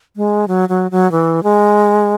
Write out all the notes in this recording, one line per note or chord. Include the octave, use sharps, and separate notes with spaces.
G#3
F#3
F#3
F#3
E3
G#3